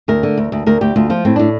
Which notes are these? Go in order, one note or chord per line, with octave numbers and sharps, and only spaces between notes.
D2 A#4
D3
D2
D2
D2 A#4
D2 G4
D2 F4
F3 F4
A2 C4
A2 D4